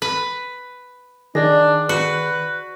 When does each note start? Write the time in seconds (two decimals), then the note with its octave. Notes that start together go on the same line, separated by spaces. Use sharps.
0.02 B4
1.35 D#3 D4 G#4 D5 A#6
1.89 F#4 B4